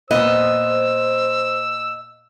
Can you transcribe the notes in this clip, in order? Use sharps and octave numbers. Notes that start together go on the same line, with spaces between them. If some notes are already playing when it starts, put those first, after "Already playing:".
A#2 B3 C5 D#5 E6